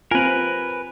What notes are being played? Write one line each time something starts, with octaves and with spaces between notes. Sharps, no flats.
C4 F4 A#4 B4 G#5